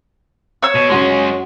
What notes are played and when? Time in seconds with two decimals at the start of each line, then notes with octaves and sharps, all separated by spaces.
0.62 C#5 E6
0.75 B2
0.90 F#2 G#3 C#4 F#4 C6